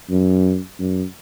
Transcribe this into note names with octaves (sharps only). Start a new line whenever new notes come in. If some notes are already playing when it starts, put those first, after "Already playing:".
F#2
F#2